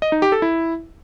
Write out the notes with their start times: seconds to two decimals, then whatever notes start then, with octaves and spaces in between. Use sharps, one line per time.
0.02 D#5
0.12 D#4
0.22 G4
0.32 A4
0.42 E4